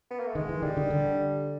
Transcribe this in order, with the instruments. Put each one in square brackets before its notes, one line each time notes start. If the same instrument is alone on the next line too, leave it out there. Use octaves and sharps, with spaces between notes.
[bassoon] B3
A#3
A3
[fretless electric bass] D#3 [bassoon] G#3
[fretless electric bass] E3
[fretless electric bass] D#3 [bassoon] G3
[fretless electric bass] D3
D3